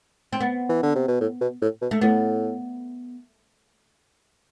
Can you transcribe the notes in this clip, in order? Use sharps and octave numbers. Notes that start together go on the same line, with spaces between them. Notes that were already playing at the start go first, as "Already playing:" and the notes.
C4
B3
E3
D3
C3
B2
A2
B2
A2
B2
A3
A2 B3